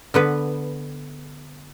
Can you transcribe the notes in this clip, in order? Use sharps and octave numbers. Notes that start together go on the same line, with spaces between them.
D3 B3 B4